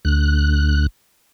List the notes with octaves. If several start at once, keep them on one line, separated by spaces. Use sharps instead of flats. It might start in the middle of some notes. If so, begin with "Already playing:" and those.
D2 F#6